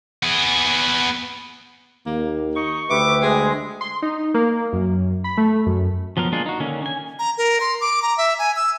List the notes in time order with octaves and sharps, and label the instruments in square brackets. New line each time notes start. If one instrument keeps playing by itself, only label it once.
[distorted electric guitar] B3 G#4
[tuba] D#2 [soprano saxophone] A#3
[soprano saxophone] D#4 [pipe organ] C#6
[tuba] D2 [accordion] G4 B4 E5 [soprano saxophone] D6
[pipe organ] G#3 [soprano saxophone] G#4
[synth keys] C6
D#4
A#3
F#2
B5
A3
F#2
[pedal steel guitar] F3 F#3 B3 A#4
G#3 A#3 D4 F4 G#4
D#4 F#4
D3 D#3 A#3 C#4
C#4 G#5
[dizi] A#5
A#4
C6
D6
A#5
E5
G#5
E6